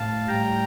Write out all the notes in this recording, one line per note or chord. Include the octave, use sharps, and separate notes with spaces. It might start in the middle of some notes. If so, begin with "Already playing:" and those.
Already playing: A2 F5 A5
A2 G3 G5 A#5